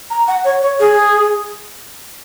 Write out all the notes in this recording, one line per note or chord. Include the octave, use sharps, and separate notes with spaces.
A#5
F#5
C#5
C#5
G#4